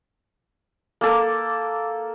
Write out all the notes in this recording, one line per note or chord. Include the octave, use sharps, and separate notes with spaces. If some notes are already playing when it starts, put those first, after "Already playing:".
A#3 A4